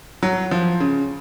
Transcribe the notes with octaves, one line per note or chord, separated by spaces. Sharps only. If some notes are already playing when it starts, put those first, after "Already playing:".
F#3
F3
C#3